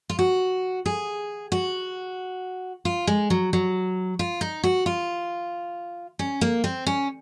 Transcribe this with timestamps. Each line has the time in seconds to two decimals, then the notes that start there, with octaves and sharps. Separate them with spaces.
0.09 F4
0.19 F#4
0.86 G#4
1.52 F#4
2.85 F4
3.07 G#3
3.30 F#3
3.53 F#3
4.19 F4
4.41 D#4
4.63 F#4
4.86 F4
6.19 C#4
6.41 A#3
6.64 C4
6.87 C#4